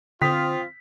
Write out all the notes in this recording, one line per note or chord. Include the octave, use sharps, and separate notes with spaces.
D3 C4 F4 G5 D#6 B6